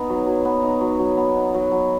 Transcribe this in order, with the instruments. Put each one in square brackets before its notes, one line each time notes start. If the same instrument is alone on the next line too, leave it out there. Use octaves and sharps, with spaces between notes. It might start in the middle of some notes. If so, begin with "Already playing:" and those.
Already playing: [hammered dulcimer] B3 D#4
F#3
F#3
B3
D#4
F#3
F#3
B3
D#4
F#3
F#3